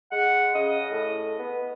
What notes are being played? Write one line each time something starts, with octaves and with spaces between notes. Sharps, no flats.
G#3 F#5
C#3 D#5
A2
B3